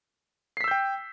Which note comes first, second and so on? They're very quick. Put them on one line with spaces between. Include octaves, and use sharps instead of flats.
C7 B6 E6 G6 G5